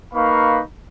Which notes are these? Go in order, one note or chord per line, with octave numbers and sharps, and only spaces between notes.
A#3 D#4 B4 F5 B5 C#6